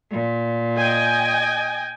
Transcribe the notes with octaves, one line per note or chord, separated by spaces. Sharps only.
A#2
D#5 G5 G#5